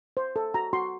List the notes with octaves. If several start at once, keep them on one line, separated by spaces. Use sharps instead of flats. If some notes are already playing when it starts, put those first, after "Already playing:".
C5
A4
F#4 A#5
F#4 C6